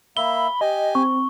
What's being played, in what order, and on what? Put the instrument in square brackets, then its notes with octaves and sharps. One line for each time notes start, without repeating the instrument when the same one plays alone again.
[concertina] A#3 E5 [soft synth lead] B5 [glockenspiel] G7
[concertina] G4 G#5 [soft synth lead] D#5
[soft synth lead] C4 [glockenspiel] C#6